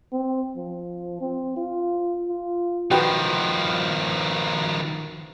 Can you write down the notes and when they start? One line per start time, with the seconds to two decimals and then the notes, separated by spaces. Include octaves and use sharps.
0.12 C4
0.56 F3
1.21 C4
1.57 F4
2.29 F4
2.91 D#3 F3 F#4 B4 G5